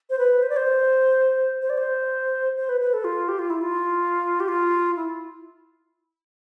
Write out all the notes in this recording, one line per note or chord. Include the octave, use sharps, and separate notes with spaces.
C5
B4
C5
D5
C5
C5
D5
C5
C5
B4
B4
A4
F4
G4
F4
E4
F4
G4
F4
E4